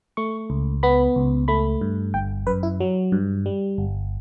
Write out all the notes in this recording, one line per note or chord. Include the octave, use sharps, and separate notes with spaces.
A3 C#6
C#2
B3 B5
C#2
A3 B5
G2
G1 G5
F#2 B4
E4
F#3
G2
G3
G1